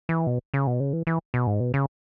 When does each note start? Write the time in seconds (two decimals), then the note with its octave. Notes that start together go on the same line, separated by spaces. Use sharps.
0.09 E3
0.27 B2
0.54 C#3
0.67 B2
0.80 C#3
0.93 E3
1.07 E3
1.34 B2
1.47 G#2
1.60 B2
1.74 C#3